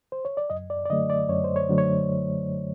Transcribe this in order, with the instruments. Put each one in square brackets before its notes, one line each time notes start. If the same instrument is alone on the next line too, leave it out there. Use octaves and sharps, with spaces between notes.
[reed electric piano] C5
C#5
D5
F#2 D#5
D5
D5
D3 F#3 A3 D#5
D5
F#2 C#5
C5
C#5
D3 F#3 A3
C#5